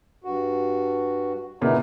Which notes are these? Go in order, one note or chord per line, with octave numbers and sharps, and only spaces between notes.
G2 F#4
A#2 C#3 B3 D#4 E4